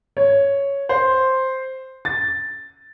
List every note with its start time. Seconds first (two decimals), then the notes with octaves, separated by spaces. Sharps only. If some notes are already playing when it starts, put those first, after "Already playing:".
0.17 C#5
0.89 C5
2.05 A6